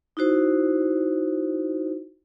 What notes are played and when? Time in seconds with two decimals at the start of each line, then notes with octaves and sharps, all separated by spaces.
0.17 D#4 E4 F#4 C5